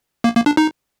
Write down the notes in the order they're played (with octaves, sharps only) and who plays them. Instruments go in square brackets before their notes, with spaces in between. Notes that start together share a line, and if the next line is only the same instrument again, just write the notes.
[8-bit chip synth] A#3
A#3
D4
D#4